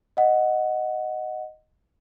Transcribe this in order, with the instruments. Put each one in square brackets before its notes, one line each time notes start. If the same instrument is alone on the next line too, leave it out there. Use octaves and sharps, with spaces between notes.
[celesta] D#5 F#5